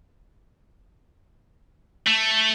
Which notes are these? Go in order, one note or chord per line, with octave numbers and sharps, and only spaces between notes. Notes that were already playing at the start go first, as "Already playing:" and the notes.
A3